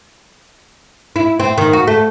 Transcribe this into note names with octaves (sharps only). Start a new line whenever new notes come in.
E4
C4
D#3
F#4
A3